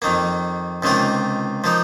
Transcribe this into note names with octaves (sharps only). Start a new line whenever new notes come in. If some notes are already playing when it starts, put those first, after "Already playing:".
F2 D#3 A#3
C#2 C3 D#3 A#3 F4
F3 A#3 D#4